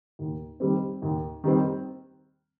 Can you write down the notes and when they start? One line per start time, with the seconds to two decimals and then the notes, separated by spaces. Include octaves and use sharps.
0.19 D#2
0.60 D#3 G3 C4
1.02 D#2
1.44 D#3 G3 C4